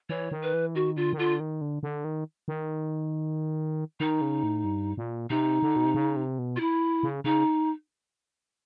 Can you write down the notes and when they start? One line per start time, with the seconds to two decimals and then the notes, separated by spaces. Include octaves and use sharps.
0.09 E3 C#5
0.31 D#3
0.42 B4
0.54 E3
0.75 D#3 F#4
0.96 D3 F4
1.13 D#3
1.18 D3 F4
1.40 D#3
1.61 D3
1.83 D3
2.04 D#3
2.48 D#3
4.00 D#3 D#4
4.21 C#3
4.43 A2
4.64 G2
4.97 A#2
5.30 C3 D#4
5.62 D3
5.76 B2
5.85 C3
5.95 C#3
6.16 C3
6.39 B2
6.56 F4
6.60 E4
7.03 C#3
7.24 C#3 D#4